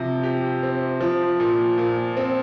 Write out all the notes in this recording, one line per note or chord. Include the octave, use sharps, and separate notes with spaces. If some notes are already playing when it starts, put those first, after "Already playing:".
Already playing: C3 F3
G4
C4
F3
A#2
A#2
C4